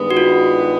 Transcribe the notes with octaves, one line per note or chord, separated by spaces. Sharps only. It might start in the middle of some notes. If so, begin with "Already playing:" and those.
Already playing: G2 D#3 G#3 B3
F#4
F4